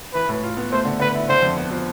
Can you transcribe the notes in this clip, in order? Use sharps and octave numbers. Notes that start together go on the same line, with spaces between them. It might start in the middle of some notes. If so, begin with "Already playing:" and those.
E3 B4
A2
F4
B3
A3 C5
D3
D3 B4
E4
D3 C5
F2
B3
F3